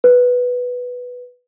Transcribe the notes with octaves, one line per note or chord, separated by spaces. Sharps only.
B4